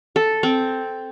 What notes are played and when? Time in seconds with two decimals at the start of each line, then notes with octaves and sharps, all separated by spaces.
0.16 A4
0.43 C4